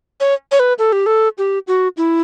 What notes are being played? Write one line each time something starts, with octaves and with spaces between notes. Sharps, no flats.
C#5
C#5
B4
A4
G4
A4
G4
F#4
E4